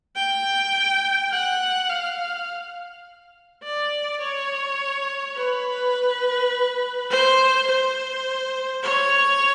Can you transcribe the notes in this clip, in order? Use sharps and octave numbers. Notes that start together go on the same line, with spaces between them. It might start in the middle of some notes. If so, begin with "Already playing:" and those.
G5
F#5
F5
D5
C#5
B4
C5
C5
C#5